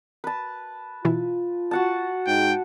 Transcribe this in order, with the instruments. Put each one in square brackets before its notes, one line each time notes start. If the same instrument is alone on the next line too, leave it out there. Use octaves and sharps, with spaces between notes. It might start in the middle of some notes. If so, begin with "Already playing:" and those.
[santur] B4 A5
[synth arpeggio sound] B2 E3 E4 [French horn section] F4
[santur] F#4 F#5 A5
[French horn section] G#2 [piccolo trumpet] G5